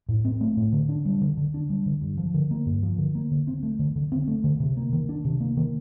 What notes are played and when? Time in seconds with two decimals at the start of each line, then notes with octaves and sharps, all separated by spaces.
0.09 A2
0.25 C4
0.41 A3
0.57 A2
0.72 D3
0.89 D4
1.05 G3
1.22 D3
1.37 D3
1.54 D4
1.70 G3
1.86 D3
2.02 G2
2.18 F3
2.34 D3
2.51 A#3
2.66 G2
2.83 F3
2.98 D3
3.15 A#3
3.31 D3
3.47 C4
3.63 A3
3.79 D3
3.96 D3
4.12 C4
4.28 A3
4.44 D3
4.60 C3
4.77 A#3
4.93 D#3
5.09 D4
5.25 C3
5.40 A#3
5.57 D#3